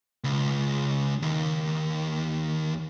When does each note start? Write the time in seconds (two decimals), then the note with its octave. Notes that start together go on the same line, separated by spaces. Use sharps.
0.24 C#2
1.22 D#2